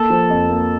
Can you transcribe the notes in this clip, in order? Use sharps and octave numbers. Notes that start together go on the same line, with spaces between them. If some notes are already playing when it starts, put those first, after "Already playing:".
Already playing: A#3 A4
F3
F2
A#3